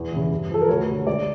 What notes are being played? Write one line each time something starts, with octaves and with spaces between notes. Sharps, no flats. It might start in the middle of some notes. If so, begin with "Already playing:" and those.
Already playing: E2
C#3 E3
G2
F3 A4
A#4
D2 C#5
D3 G3
C#2 D5